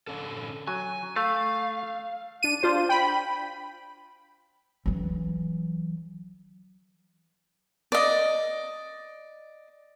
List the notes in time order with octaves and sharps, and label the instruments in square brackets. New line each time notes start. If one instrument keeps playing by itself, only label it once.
[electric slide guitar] D3 C#4 A4
[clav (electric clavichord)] F#3 [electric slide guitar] G#5
[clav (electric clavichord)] A3 [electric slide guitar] F5
[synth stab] D4 D#7
D4 F4 C5
G5 B5
[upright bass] E3 F#3
[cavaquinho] D5 D#5